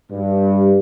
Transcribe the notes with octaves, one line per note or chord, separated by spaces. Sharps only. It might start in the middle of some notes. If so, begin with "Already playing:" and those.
G2